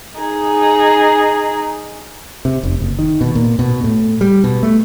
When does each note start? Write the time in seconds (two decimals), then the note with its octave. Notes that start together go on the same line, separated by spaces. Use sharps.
0.19 D#4 G#4
2.45 C3
2.63 F1
2.80 F#1
2.99 D#3
3.21 B2
3.35 A#2
3.59 B2
3.84 A2
4.21 G3
4.44 B2
4.63 A3